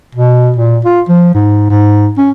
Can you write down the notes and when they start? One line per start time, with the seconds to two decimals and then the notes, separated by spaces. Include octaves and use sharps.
0.15 B2
0.56 A#2
0.85 F4
1.09 F3
1.34 G#2
1.70 G#2
2.18 C#4